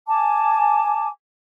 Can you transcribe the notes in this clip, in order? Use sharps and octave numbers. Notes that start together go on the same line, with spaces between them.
G#5 A5 D6